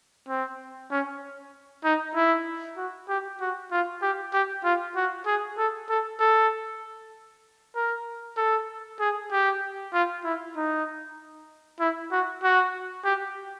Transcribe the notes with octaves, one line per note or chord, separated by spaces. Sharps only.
C4
C#4
D#4
E4
F#4
G4
F#4
F4
G4
G4
F4
F#4
G#4
A4
A4
A4
A#4
A4
G#4
G4
F4
E4
D#4
E4
F#4
F#4
G4